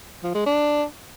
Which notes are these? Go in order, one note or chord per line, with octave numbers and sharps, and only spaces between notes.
F3
G#3
D4